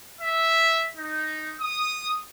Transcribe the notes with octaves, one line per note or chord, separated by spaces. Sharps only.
E5
D#4
D#6